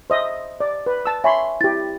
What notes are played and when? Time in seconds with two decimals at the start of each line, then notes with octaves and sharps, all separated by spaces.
0.10 C5 D#5 E5
0.60 D5
0.86 B4
1.06 A5 E6
1.24 C#5 E5 G#5 B5 C6
1.61 E4 G4 A6